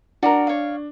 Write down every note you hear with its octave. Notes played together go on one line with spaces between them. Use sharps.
D4 F#4 A#4
C#5 F5